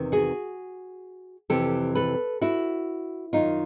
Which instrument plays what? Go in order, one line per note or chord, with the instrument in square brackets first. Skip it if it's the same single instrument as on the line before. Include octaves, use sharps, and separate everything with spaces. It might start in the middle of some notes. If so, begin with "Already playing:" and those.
Already playing: [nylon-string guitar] E2 C3 D#3
F#4 G#4
F2 C3 E3 G4 A4
A4 B4
E4 F#4
F#2 D#3 D#4 F4